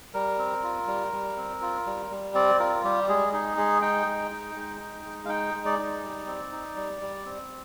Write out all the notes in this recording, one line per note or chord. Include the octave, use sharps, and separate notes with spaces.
G3 A#4
C4
F4
G3
G3
C4
F4
G3
G3
C4 D5
F4 A#4
G3 G4
G#3 G#4
D#4 G#4
G#3 G#4
D#4 G5
G#3
D#4
G#3
D#4
G#3
F5
D#4 G5
G#3
D5
D#4
G3
C4
D#4
G3
G3
C4